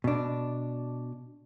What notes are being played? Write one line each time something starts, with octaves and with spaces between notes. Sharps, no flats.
B2 D4